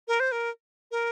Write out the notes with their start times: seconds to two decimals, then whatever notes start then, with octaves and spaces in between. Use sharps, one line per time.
0.08 A#4
0.20 C5
0.32 A#4
0.91 A#4